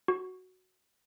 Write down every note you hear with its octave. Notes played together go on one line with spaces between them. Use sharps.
F#4